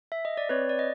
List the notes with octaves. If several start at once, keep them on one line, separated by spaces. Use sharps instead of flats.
E5
D#5
D5
C4 B4 C#5
D5
D#5